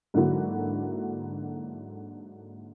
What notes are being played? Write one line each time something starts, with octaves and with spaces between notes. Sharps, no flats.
G#2 D3 F#3 A#3 E4 F#4